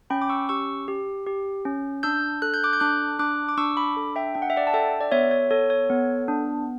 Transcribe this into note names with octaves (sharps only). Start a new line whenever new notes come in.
C#4 G5 B5
D6
C#6 E6
G4 C#6 E6
G4
G4
C#4
D4 E6 G6
A4 F#6
G6
D6 F#6
G6
D4 D6 F#6
D4 D6 F#6
D6
D4 C#6 E6
B5 D6
A4
E5 G5
D4 G5
F#5
E5
D5 F#5
A5
A4 E5 G5
D5
B3 C#5 E5
C#5
A4 C#5
C#5
B3
D4